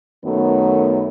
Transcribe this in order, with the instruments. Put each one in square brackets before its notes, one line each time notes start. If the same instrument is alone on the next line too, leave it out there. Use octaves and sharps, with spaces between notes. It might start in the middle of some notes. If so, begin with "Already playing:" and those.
[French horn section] F#2 D#3 F#3 A3 B3